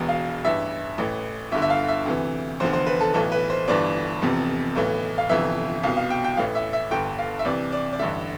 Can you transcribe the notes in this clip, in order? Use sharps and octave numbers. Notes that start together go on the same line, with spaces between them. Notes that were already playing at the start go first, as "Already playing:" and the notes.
Already playing: E1 E2 B2
F5
A1 G2 E3 E5
A1 A2 E3
G1 G2 D3 E5
E5
F5
E5
D2 C3 E3
F1 E2 D3 C5
C5
B4
A4
B1 A2 E3 A4
B4
C5
G1 G2 E3 D5
F1 E2 C3
B1 A2 E3
F5
G1 F2 C3 E3 E5
C2 B2 F5
F5
G5
G5
A1 A2 E3 F5
E5
E5
G1 G2 D3 G5
F5
E5
C2 C3 E3 D5
D5
D5
A1 G2 D3 E5